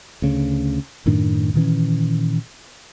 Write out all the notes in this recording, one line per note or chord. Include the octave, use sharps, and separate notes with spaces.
D2 C#3
F#2 A2 D#3 D4
A#2 D#3 E3 C#4